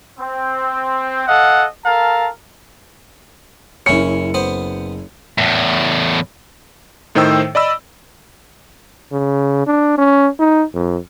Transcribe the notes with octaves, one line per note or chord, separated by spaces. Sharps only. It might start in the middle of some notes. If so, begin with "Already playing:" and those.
C4
A4 D#5 F5 F#5
A4 A#4 F5 A5 A#5
F#1 C#4 E4 C#7
B3 C5
E2 A2
A2 D#3 D#4 C5 G5 E6
D5 D#5 B5 E6
C#3
D4
C#4
D#4
F2